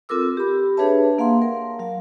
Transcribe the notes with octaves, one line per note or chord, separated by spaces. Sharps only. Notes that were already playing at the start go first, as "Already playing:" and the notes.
C4 F4 A4 A#4 D6 E6
G4 B5
D4 G#4 B4 C#5 E5 A5
A#3 F5 F#5 C6
A#4
F#3 F5